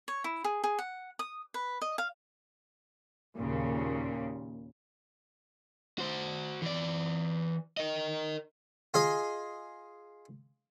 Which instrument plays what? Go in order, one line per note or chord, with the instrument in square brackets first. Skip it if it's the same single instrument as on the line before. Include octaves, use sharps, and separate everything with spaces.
[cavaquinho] C#5
E4
G#4
G#4
F#5
D#6
B4
D#5
F5
[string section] D#2 A#2 C#3
[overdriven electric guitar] F#4 C5
E3 D5
A#4 D#5
[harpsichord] F4 G#4 D#5